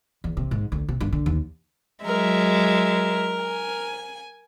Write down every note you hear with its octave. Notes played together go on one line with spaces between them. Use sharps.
E2
C3
G#2
D2
C3
G2
D3
D#2
F#3 G#3 A#4 E5
G#5